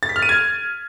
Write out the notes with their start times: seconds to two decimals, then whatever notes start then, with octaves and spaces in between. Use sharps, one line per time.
0.03 A6
0.09 B6
0.16 F6
0.22 D#7
0.29 G#6